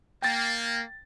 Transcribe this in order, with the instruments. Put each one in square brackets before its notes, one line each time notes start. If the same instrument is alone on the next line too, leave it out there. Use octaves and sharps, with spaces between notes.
[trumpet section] A#3 [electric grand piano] G5 A6